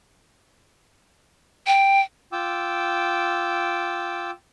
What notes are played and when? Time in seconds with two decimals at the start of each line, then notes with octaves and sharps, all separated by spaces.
1.67 G5
2.32 F4 G5 D6 E6